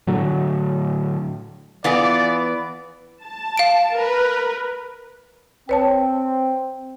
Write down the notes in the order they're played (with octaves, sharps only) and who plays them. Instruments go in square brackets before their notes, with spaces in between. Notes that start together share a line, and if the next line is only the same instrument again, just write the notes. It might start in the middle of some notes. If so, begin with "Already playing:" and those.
[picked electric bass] A2 D3 F#3 A3
[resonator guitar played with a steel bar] E3 B3 [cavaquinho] F4 G#4 [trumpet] D5
[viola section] A5
[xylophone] F5 D7
[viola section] A#4 B4
[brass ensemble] C4 G5 [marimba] B4 C#5 A5